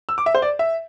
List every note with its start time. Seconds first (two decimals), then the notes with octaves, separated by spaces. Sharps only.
0.09 E6
0.18 D6
0.26 E5
0.35 C5
0.42 D5
0.59 E5